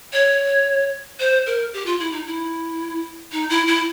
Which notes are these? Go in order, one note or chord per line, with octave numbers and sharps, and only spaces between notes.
C#5
C5
A#4
G4
F4
E4
D#4
E4
D#4
E4
E4